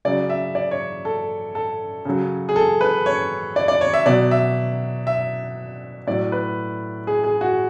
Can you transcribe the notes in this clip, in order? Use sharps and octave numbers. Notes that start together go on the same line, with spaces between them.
C#3 F#3 D5
E5
D5
C#5
A4
A4
C#3 F#3
G#4
A4
B4
C#5
D5
D5
C#5
E5
B2 F#3 D5
E5
E5
A2 F#3 D5
B4
G#4
G#4
F#4